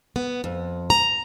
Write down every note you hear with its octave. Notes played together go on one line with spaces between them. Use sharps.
B3
F2
A#5